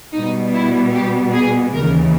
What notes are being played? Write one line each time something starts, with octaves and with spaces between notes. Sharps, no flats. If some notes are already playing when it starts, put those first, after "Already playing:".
B2 G3 B3 D#4
E4
G4
G#4
D#2 C#3 E3 A#4